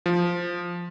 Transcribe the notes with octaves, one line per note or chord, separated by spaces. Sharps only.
F3